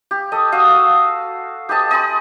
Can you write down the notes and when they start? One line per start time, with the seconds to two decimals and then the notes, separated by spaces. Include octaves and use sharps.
0.11 G4
0.32 A4 D#5
0.52 F#4 F5 D#6 E6
1.69 G4 B4 D#5 A5
1.91 D#5 G#5 B5 C6